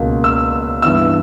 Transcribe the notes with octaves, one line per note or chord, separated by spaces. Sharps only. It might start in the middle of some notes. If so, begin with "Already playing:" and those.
Already playing: C#2 B2 A#3
E6
G2 E3 B3 E6